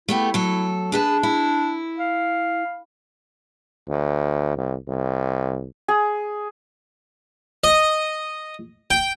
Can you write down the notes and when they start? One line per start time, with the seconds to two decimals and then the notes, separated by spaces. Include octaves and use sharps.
0.09 A3 B3 E4 G4
0.34 F#3 A4
0.92 D4 G#4 B4 A5
1.23 E4
1.98 F5
3.89 D2
4.57 C2
4.88 C2
5.88 G#4
7.64 D#5
8.90 G5